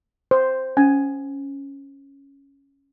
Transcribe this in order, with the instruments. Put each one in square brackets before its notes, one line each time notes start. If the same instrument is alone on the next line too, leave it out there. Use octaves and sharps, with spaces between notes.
[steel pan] C5
[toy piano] C#4 [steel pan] G#5